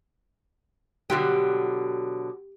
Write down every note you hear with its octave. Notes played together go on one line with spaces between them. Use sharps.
B2 D3 F#3 G4